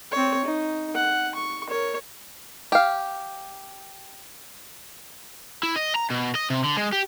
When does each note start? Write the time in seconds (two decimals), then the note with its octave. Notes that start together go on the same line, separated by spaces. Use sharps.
0.12 C4 C#5
0.45 D#4
0.95 F#5
1.35 C#6
1.69 A#4 C#5
2.72 G4 F5
5.63 E4
5.76 D#5
5.96 A#5
6.10 B2
6.35 D#5
6.50 C3
6.64 D3
6.77 G#3
6.93 G4